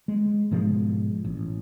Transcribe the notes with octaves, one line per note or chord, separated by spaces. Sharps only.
G#3
G#2 B2 F3 G#3
A1